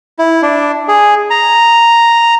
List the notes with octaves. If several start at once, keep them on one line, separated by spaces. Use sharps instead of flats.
E4
D4
G#4
A#5